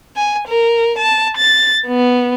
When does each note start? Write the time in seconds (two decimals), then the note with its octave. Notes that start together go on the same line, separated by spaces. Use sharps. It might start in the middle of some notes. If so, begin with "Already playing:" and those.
0.17 G#5
0.48 A#4
0.98 A5
1.37 A6
1.87 B3